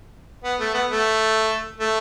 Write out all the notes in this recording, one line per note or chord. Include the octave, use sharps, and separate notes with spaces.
B3
A3
B3
A3
A3